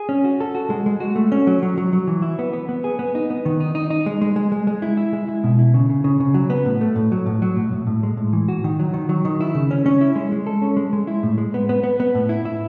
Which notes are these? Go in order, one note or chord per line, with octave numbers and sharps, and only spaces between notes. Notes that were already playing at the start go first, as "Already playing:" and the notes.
Already playing: G#4
C#4
F#4
A4
F#4
G#3
G#3
F#4
A3
C#4
F#3
F#3
F#3
F#3
E3
E4
B3
B3
B3
G#4
B3
D#4
B3
D#3
D#4
D#4
D#4
G#3
G#3
G#3
G#3
G#3
E4
E4
G#3
E4
B2
E4
C#3
C#3
C#3
C#3
F#3
B3
A2
A3
A2
F#3
A2
F#3
A2
A2
A2
G#3
A2
E3
F#4
D#3
F#3
D#3
F#3
D#3
E4
C#3
C#4
C#4
E4
G#3
G#3
A4
C#4
G#3
G#3
E4
A2
G#3
B3
B3
B3
B3
A2
E4
E4